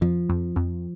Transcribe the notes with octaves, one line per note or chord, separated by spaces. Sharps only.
F2 F3
F2
F2